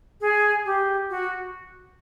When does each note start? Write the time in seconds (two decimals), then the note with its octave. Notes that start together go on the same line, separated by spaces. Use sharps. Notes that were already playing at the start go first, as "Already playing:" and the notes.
0.21 G#4
0.65 G4
1.10 F#4